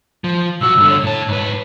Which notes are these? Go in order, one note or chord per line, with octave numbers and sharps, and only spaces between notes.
F3
B1 F#4 E6
G2 D3
C#5
A2 A5
G#2 B4